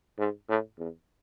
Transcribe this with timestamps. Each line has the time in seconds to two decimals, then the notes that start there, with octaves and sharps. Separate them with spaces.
0.19 G#2
0.49 A2
0.78 E2